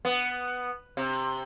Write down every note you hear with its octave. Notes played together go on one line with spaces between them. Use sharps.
B3
C3